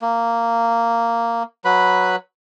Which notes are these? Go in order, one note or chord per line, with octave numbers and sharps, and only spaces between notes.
A#3
F#3 B4 B5